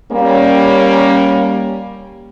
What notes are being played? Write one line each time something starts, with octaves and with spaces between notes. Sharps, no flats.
G3 A#3 C#4